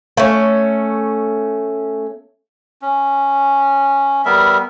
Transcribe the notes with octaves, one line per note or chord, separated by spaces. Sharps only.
A3 C#4
C#4
G3 B3 A#4 E5